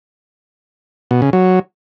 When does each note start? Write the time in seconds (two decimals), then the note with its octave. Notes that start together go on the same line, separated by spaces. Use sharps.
1.11 B2
1.22 C#3
1.33 F#3